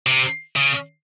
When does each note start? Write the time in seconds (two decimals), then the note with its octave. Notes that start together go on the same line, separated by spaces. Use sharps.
0.06 C3
0.56 C#3